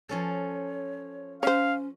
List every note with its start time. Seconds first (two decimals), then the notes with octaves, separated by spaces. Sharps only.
0.09 F3 C#4 A4 C#5
1.43 C#4 C5 C#5 F5